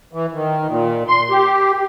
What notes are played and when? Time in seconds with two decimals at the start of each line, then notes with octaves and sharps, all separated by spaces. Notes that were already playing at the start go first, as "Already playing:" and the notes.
0.13 E3
0.34 D#3
0.69 A#2
1.08 C6
1.30 G4